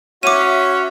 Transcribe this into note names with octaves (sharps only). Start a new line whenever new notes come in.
C#4 F#4 E5 D6 D#7